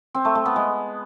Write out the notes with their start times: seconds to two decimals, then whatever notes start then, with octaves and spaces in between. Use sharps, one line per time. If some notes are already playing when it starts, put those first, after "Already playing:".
0.14 C4
0.25 A3
0.35 A3
0.45 B3
0.56 G#3